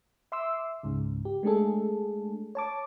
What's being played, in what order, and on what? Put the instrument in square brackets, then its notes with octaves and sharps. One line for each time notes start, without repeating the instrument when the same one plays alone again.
[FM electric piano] E5 C6 D6 E6
C#2 G#2 C#3
G4
G#3 A3 D4 G#4 A4
C#5 A5 D6